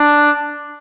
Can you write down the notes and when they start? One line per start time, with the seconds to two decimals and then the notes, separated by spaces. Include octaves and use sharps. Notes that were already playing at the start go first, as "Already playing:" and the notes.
Already playing: D4